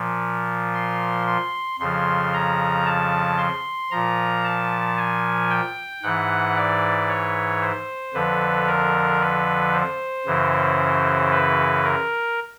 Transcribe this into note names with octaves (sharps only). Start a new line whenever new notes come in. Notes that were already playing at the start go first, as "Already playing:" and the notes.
Already playing: A#2 F3
C6
C6
F2 C#3 F3 C6
A#5
A5
C6
A#2 F3 A#5
A5
G#5
G5
G#2 E3 F#5
D5
C#5
C5
F2 D3 F3 B4
A#4
B4
C5
F#2 C#3 E3
B4
A#4